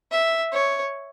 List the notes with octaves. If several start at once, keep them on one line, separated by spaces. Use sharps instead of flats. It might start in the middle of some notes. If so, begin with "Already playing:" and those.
E5
C#5